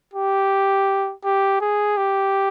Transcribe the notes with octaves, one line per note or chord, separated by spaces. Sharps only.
G4
G4
G#4
G4